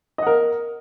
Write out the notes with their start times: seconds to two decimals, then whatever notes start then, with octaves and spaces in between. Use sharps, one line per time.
0.18 D#5
0.22 F#5
0.27 A#4